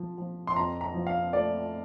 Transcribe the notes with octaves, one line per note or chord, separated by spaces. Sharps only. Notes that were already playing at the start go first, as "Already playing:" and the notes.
Already playing: F3
F3
C6
F2 A#5
A#5
F3
F5
A3 D5